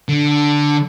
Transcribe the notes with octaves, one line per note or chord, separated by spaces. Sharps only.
D3